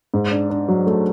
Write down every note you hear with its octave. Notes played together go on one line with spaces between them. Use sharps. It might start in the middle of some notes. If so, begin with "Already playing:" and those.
G#2
D4
D4
F#3
A3